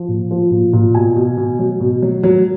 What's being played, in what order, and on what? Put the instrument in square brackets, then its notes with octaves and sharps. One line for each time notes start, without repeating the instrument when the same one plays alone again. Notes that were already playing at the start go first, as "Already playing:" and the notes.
Already playing: [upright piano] F3
A#2
F3
A#2
A#2
B2 G#5
B2
B2
F#3
B2
F#3
F#3